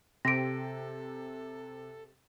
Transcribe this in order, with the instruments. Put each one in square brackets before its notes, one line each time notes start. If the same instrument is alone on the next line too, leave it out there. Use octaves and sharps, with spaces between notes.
[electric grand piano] C3 [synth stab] C4 G4 [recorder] A4 [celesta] A#6 D7